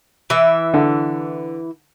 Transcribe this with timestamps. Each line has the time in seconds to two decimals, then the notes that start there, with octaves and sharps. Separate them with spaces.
0.30 E3 E5
0.74 D3